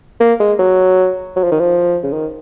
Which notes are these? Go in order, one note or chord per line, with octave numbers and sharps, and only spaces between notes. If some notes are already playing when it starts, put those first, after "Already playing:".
A#3
G#3
F#3
F#3
F3
D#3
F3
C#3
D#3